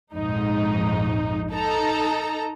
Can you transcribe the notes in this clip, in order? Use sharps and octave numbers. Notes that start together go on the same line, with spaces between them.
A#1 F2 G#2 D#4
D#4 A4 A#5